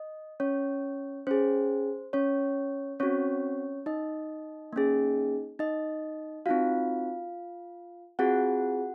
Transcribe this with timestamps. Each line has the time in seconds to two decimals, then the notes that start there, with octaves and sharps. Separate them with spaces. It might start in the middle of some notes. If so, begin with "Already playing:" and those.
Already playing: D#5
0.40 C#4 C#5
1.27 C#4 G#4 C5
2.13 C#4 C#5
3.00 C4 C#4 F#4 C#5
3.86 D#4 D#5
4.73 A#3 C#4 G#4
5.59 D#4 D#5
6.46 C4 D#4 F4 F#4 F5
8.19 C4 F4 F#4 G#4 F#5